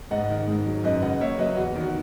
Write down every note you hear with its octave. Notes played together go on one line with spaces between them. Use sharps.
G#2 D#5 F#5
D#3
G#2
F#3
F#2 B4 D#5
C#3 D#5 F#5
A#3 C#5 E5
F#3 B4 D#5
E2 F#4
D#3 F#4